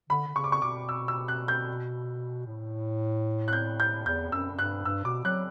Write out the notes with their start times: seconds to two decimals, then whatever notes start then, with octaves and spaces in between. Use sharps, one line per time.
0.10 D3 B5
0.27 D3
0.35 C#3 C#6
0.44 D6
0.52 C#6
0.62 B2 D6
0.89 E6
1.08 E6
1.28 F#6
1.48 G6
2.47 A2
3.48 F#6
3.53 G6
3.80 G6
4.06 E2 G6
4.32 F#2 E6
4.52 F#2
4.59 G2 F#6
4.85 G2 E6
5.04 B2 D6
5.25 F#3 F#6